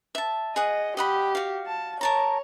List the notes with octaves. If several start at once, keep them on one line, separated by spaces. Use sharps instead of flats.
E5 A5
G#4 D#5 F#5 D#6
G4 D#5 F#5 B5
F#4 F5
A5
A#4 C#5 A5 A#5